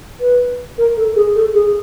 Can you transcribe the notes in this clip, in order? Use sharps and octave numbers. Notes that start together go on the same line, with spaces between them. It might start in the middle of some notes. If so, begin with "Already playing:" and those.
B4
A#4
A4
G#4
A4
G#4